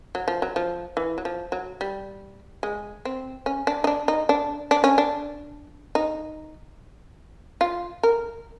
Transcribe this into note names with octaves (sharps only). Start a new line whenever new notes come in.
F#3
F3
F#3
F3
E3
F#3
F3
F#3
G3
G#3
C4
C#4
D4
D#4
D4
D#4
D4
D4
C#4
D4
D#4
F4
A#4